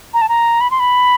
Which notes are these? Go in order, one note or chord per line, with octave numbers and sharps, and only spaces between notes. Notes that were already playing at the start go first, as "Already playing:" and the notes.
A#5
A5
A#5
B5
C6
B5